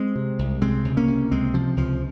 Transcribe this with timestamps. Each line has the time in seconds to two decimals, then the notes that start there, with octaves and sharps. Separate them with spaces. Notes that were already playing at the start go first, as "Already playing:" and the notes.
Already playing: G#3 C4
0.16 C3
0.39 C2
0.61 C3 G#3 C4
0.85 C#2
0.97 A#3 C#4
1.08 C3
1.31 C#2 G#3 C4
1.54 C3 F3
1.77 C#2 F3